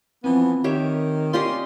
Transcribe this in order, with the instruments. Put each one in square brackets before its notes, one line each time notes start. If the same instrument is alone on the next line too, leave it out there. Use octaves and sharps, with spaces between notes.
[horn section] E3 F3 B3 [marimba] C4
[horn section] D#3 [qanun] G4 C#5 E5
[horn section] C#4 D5 C6 [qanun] F4 G4 D#5